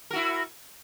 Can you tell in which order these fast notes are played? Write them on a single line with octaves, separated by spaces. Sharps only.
A#4 F#4 E4